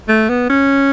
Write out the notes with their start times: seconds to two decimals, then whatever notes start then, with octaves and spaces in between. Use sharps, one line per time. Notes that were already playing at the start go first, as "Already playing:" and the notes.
0.08 A3
0.29 B3
0.50 C#4